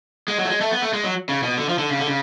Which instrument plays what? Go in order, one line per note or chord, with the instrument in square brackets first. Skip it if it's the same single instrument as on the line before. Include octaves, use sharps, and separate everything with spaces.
[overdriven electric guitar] G#3
F#3
A3
G#3
A3
B3
A3
G#3
F#3
C#3
B2
D3
F3
D3
C#3
D3
C#3